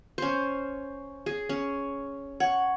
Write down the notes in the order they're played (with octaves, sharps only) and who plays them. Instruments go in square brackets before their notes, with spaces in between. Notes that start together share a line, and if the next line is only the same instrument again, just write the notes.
[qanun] C#4 C5
G#4
C#4
[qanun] C#5 [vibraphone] F#5